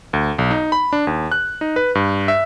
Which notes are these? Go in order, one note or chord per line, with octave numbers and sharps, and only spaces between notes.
D2
B1
D#4
B5
D4
D#2
F#6
D#4
B4
G2
E5